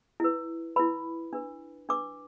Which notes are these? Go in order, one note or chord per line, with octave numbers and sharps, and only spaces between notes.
E4 B4
E4 B4 B5
D4 B4
D4 B4 D6